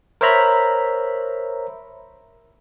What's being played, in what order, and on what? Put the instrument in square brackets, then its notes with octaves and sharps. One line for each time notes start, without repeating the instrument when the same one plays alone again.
[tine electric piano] A#4 C5 C#5 E5 A#5 B5